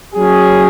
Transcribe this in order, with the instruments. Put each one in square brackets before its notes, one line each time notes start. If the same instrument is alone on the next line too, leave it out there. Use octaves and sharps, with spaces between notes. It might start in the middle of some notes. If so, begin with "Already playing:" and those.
[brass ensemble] F#3 C#4 G#4